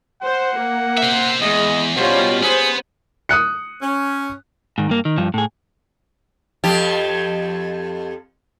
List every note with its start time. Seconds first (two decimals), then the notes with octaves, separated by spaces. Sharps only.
0.22 C5 F#5
0.56 A#3
0.98 C5 E5
1.41 E2 G#3 D#5
1.97 B2 G3 C#4 F4 C5
2.43 B3 G#4 C5
3.29 D#6 F#6 C#7
3.82 C#4
4.78 G#2 D#3
4.89 G2 A#3
5.05 D#3
5.18 G2 F3
5.34 A2 G#4
6.64 F2 F3 G4